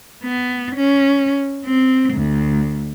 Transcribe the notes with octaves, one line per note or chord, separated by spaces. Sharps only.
B3
C#4
C4
D2